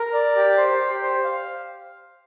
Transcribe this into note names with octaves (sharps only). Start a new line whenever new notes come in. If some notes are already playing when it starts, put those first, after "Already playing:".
Already playing: A#4
D5
G4
C5
G4
C5
F5